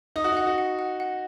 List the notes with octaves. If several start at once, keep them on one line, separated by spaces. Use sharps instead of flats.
D#4 D#6
F#4
D#4
F#5
F#4
F#5
F#5
F#5